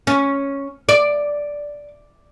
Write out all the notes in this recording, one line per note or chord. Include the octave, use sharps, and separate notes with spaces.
C#4
D5